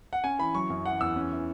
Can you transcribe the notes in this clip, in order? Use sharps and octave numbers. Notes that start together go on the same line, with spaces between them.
F#5
C#4 G#5
E3 B5
F#3 C#6
F#2
E3 F#5
E2 E6
C#4
E3